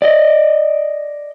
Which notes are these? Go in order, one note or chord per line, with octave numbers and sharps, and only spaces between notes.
D5 D#5